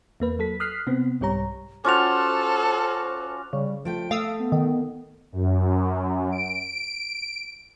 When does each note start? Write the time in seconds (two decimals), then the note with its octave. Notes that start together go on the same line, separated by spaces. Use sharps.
0.20 E2 A#3 B4
0.39 F#3 A4 B6
0.60 D#6 F6 F#6 B6 C7
0.87 C3 B3 C4
1.21 C2 G#2 G3 G4 C#5 A#5
1.85 C#4 F4 F#4 A4 C5 D6 F7
3.53 C#3 G3
3.85 F3 A3 G5 D7
4.11 A3 F5 D#6 E6
4.39 B3
4.52 D#3
5.32 F#2
6.32 D7